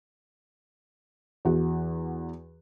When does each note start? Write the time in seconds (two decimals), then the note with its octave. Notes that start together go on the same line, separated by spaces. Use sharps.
1.45 E2 F#4